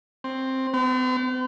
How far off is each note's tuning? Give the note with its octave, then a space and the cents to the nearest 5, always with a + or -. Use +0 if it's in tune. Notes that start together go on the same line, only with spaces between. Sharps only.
C4 +10
C4 -45